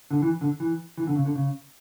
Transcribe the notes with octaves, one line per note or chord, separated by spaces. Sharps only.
D3
E3
D3
E3
E3
D3
C#3
D3
C#3